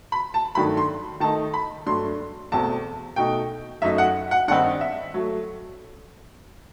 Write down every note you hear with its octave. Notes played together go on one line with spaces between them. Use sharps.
B5
A5
G2 D#3 F#3 A3 B5
C6
D#3 A3 D#4 A5
B5
G2 F#3 A3 C6
E2 B2 A3 C4 A5
B2 A3 D#4 G5
F#2 F#3 A3 D#4 E5
F#5
F#5
G2 D#3 G3 C4 D#4 F#5
E5
F#3 A3